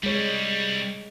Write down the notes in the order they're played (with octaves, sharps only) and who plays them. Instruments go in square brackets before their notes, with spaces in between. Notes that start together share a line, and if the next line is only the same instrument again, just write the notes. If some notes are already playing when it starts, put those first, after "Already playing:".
[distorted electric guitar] C2 G3 [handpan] G#3 C#5